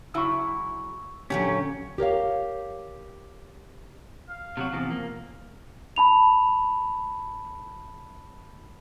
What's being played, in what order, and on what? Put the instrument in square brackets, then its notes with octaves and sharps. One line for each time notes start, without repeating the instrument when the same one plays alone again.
[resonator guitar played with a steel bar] C#3 F#3 E4 [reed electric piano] C#6 E6
[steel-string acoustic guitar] A#2 D3 F#3 [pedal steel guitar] C#4 [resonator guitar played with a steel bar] G4
[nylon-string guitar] G4 A#4 C#5 F5
[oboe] F5
[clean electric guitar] C3 F#3 F#4
E2 C3 F3
A#3
[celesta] A5 B5 F7